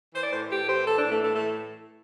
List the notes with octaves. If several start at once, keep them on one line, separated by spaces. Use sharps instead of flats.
E3 C5
D5
A2 C5
A2 G4
E3 C5
E3 A4
D4
A2
A3
A2 A3
A3
E3